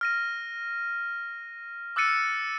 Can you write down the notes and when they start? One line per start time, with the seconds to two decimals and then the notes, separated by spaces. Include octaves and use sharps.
0.01 F6 A#6 D#7
1.96 D6 E6 F#6 A6 C#7 D#7